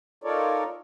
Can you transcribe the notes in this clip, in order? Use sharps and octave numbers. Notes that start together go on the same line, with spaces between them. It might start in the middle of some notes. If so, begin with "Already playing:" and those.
D#4 F4 A4 A#4 C#5 D5